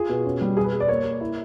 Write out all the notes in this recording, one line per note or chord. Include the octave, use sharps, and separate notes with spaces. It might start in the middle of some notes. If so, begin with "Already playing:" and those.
Already playing: F4 G#4
B2
C#4
G3
B2 G#4
B4
B2
D5
A#3 C#5
A#3
E4